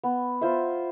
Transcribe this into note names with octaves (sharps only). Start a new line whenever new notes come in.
B3
F4 C5 E5